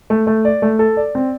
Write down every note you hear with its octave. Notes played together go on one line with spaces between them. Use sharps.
A3
A3
D5
A3
A4
D5
C4